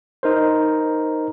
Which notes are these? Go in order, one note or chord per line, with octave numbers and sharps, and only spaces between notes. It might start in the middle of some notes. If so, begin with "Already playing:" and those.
D#4 A#4 C5